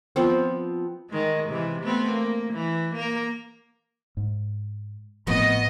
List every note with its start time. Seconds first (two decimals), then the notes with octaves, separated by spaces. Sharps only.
0.16 F3 B3 C4
1.10 D#3 G#3
1.50 C3 E3
1.82 A3 B3 C4
2.12 A#3
2.54 E3
2.96 A#3 A#4
4.17 G#2
5.27 A1 F3 A3 B3 C4 F#4 D#5